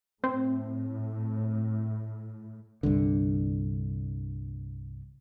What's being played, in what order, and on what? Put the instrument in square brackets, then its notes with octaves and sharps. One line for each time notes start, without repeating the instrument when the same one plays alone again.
[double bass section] A2 [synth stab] C4
[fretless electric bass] C2 G2 D3